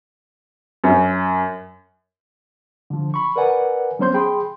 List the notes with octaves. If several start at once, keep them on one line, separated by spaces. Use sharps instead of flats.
F#2
D3 F3
B5 C#6
A#4 B4 D5 F#5 G#5
F#3 B3 C#4 C5 C6 G6
G#4 G5 B5 C6